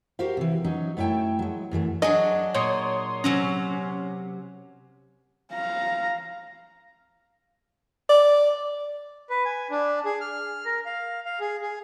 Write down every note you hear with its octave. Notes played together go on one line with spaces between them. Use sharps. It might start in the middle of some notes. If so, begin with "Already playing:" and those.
F#4 G4 A#4 C5 F5
C3 E3
F#3 C#4 D#4
F#2 A3 E4 C#5 G5 A5
F#3 G#3
F#2 E3 G3 A3
F#3 D4 G#4 D#5
A#2 C#5 C6 D#6
C3 F#3 C#4 A#5
F5 A#5
D5
B4
G#5
D4
G#4
F6
A#4
F5
F5
G#4
G#4